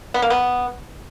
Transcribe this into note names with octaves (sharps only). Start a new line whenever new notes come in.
B3
A#3
B3